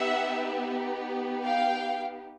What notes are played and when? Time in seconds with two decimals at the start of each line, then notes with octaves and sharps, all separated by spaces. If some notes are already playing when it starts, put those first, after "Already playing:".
Already playing: B3 D#4 G4 E5 F#5
1.44 F5 G5